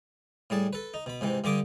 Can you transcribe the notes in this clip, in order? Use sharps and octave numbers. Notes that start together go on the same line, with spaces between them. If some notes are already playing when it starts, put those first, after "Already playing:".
A2 G3 G#4 A5
A4 B4
D#4
B2 B5
G#2 C3 E3
G2 D3 D4 G#5 D6 D#6